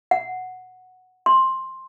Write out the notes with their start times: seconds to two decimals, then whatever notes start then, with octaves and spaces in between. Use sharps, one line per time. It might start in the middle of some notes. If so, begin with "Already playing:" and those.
0.11 F#5
1.26 C6